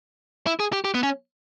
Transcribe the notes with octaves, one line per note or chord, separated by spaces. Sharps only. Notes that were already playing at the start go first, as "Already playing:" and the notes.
E4
G#4
G4
G4
B3
C#4